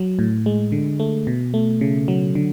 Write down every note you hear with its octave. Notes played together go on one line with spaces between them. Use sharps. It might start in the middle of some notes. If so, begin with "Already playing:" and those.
Already playing: F#3
A2
G#3
D3
A3
B2
A3
C#3
F#3
D3